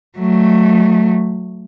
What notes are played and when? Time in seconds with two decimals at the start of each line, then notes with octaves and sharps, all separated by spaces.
0.18 F#3 A3